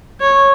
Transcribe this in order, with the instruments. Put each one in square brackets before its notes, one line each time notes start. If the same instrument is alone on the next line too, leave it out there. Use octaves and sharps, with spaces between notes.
[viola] C#5